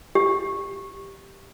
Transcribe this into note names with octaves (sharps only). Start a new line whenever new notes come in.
G4